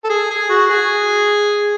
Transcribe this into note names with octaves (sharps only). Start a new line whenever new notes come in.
A4
G#4
G#4
F#4
G#4